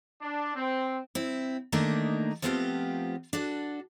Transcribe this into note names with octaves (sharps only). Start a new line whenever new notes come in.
D4
C4
C4 E4
D#3 A3 A#3 D4 D#4
F3 A3 B3 C4 F4 G4
D4 F#4 A4